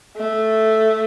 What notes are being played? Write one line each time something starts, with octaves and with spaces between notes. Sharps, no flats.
A3